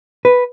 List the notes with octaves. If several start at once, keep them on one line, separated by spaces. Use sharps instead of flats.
B4